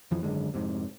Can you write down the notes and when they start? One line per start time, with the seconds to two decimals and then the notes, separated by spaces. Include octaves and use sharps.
0.11 F2 E3 F3
0.23 G#1 F#2 D3 G#3
0.54 F2 G#2 C3